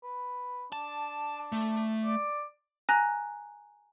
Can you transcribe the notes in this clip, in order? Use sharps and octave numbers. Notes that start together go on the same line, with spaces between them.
B4
D4 A5
A3
D5
G#5 A#5 F#6 A#6